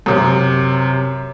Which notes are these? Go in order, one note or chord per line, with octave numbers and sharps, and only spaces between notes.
F#2 C3